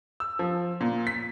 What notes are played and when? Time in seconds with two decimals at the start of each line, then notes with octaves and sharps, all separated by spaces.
0.20 E6
0.39 F3
0.81 A#2
1.07 B6